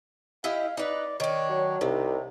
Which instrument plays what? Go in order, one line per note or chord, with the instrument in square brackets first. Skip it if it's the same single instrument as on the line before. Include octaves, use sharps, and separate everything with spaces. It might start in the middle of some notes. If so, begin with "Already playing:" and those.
[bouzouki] E4 G4 D#5 [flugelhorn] F5
[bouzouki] D#4 B4 [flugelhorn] D5
[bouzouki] D#3 D4 [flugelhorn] C#5
[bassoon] F#3
[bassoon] C2 [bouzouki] C3 [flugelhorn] D#4